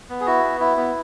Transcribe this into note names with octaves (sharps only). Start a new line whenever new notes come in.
B3
G#4
E4 F#4
B3
E4
B3